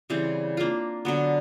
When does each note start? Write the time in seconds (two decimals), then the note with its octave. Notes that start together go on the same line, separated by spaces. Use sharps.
0.10 C#3 E3 G3 C4
0.57 A#3 D4 F4
1.05 D3 F#3 B3